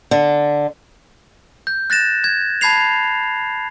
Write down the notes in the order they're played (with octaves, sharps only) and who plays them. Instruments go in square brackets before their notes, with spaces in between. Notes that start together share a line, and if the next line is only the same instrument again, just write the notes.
[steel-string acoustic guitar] D3
[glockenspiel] G6
F#6 A6 A#6 E7
G#6
A5 B5 G#6 C7 F7